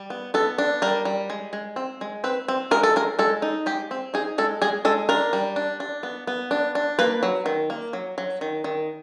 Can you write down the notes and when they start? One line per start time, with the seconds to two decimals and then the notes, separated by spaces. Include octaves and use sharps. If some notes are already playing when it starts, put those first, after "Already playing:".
Already playing: G3
0.10 B3
0.34 B3 A4
0.58 D4
0.82 G3 A#4
1.05 G3
1.30 G#3
1.53 G#3
1.76 C4
2.01 G#3
2.24 C4 B4
2.48 C4
2.71 G#3 A#4
2.83 A4
2.96 G#3 A#4
3.19 G#3 A4
3.42 D#4
3.66 G#3 G4
3.91 C4
4.14 D#4 G#4
4.38 G#3 A4
4.62 G#3 G#4
4.85 G#3 A4
5.09 D4 A#4
5.33 G3
5.56 D4
5.80 D4
6.03 B3
6.27 B3
6.51 D4
6.75 D4
6.99 A#3 B4
7.23 F#3
7.46 D#3
7.70 A#3
7.93 F#3
8.18 F#3
8.41 D#3
8.64 D#3